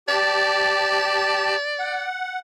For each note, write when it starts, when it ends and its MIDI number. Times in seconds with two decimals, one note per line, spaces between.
0.08 1.56 67
0.08 2.05 74
0.08 1.56 81
1.79 2.39 78